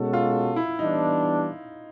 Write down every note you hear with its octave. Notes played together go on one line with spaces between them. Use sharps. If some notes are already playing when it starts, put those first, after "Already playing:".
Already playing: B2 G#3 C#4 F#4 A4
F4
E4
E3 G3 B3 D4 D#4